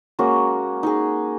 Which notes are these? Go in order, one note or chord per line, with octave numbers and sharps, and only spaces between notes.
G#3 A#3 C#4 F#4
D#4 G#4